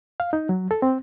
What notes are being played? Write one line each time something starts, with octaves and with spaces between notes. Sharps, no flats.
F5
D#4
F#3
A4
C4